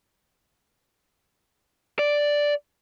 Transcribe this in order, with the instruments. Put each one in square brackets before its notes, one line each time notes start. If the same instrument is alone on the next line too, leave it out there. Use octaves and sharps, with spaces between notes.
[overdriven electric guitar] D5